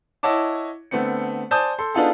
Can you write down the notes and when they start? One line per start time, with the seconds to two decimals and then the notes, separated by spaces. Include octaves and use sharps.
0.23 E4 C#5 D#5 F#5 A5 D6
0.91 D3 A3 B3 C4 C#7
1.51 C5 D5 G#5 A5 D#6 G6
1.79 A4 C6
1.94 B3 D4 D#4 F4 G#4 A4